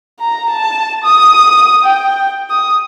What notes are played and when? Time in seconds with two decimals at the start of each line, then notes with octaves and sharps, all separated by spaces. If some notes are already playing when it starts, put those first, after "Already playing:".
0.20 A#5
0.51 A5
1.05 D#6
1.85 G5
2.50 D#6